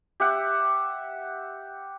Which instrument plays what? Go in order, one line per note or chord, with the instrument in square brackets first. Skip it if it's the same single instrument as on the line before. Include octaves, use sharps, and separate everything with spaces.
[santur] G4 E5 F#5